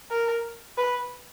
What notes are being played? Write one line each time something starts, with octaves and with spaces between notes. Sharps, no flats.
A#4
B4